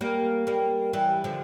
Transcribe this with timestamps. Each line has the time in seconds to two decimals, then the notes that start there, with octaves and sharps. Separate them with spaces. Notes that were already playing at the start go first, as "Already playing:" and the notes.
0.01 G3 A#3
0.47 G3 A#3
0.93 E3 G3
1.24 D3 F3